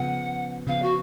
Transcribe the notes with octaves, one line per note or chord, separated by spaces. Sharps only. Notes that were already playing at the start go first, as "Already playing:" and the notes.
Already playing: C#3 F3 B3 F#5
C#3 F3 B3 F5
F#4